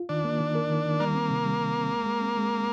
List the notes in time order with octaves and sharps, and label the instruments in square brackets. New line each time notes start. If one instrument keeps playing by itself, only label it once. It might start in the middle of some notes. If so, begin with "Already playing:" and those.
Already playing: [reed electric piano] F4
[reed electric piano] D#3 [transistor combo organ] D4
[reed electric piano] A#3
D#3
A#4
D#3
D#3
[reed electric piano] G3 [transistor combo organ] A#3
[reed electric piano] C4
C3
G3
G3
C4
G#3
G#3
C4
G#3